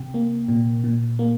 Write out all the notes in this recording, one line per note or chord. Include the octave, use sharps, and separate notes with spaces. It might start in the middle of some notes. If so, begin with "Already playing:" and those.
Already playing: C3 G5
A#3
A#2
A#2
A#3